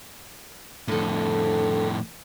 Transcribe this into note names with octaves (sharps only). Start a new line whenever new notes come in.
F2 A2 D3 A4